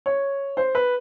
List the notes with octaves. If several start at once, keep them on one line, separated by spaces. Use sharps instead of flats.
C#5
C5
B4